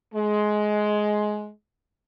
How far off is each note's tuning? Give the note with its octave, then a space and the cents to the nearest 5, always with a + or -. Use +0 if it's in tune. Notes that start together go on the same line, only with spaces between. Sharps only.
G#3 +15